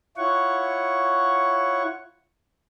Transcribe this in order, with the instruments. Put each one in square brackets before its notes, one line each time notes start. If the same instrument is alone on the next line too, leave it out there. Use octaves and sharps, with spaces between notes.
[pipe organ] E4 F4 C#5 F#5 C#6